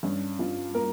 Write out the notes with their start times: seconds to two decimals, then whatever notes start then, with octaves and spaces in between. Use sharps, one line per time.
0.03 G2 C#4
0.39 G2 F4
0.75 A#3 A#4